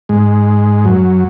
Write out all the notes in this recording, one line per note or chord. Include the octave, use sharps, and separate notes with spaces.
G#2 G#3
F#2 F#3